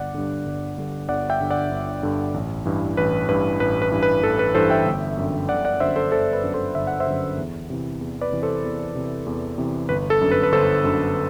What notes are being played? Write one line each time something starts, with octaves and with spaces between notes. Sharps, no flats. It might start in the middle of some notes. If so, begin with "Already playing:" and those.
Already playing: G1 D5 F#5
G2 D3
G1
G2 D3
G1 D5 F#5
E5 G5
G2 D3
D5 F#5
G1
G2 D3
A1
G2 E3
A1 B4
G2 E3 B4
A1 B4
B4
G2 E3
B4
A1 A4
B4
G2 E3 A4 C5
E5 G5
G1
F#2 D3
G1 D5 F#5
D5 F#5
F#2 D3 C5 E5
A4 C5
G1 A4 C5
B4
F#2 D3
A4 C5
G1 E5
F#5
C5 E5
F#2 D3
E2
C3 E3
E2
B4 D5
C3 E3
A4 C5
E2
C3 E3
E2
C3 E3
G1 B4
A4
F#2 D3
B4
B4
G1 A4 C5
F#2 D3